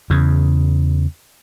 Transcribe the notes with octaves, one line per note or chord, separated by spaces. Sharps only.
E2 C#3